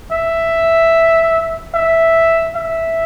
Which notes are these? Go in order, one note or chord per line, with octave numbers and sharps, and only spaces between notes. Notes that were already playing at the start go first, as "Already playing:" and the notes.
E5
E5
E5